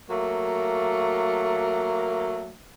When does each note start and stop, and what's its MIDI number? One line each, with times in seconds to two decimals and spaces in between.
0.10 2.54 54
0.10 2.54 57
0.10 2.54 58